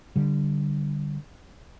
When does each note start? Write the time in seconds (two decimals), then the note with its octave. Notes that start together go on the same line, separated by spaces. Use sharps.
0.16 D3 G3